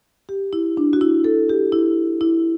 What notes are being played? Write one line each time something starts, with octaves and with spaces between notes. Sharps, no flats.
G4
E4
D4
F#4
E4
A4
G4
E4
E4